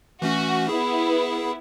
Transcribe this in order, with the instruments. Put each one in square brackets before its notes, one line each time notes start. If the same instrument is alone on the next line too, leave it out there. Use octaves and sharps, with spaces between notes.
[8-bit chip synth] E3 A3 C#4 [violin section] F#4
[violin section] B3 E4 [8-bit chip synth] G#4